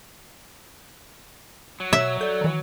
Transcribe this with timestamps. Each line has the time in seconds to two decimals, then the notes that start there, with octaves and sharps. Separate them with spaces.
1.80 F#3
1.93 B2 C#5 E5
2.21 A4 D5 G6
2.41 D#3 E3